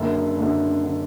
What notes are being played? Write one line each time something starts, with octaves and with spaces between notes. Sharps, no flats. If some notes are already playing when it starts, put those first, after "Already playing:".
Already playing: F#1 F#2 D3
F#1 F#2 D3
D3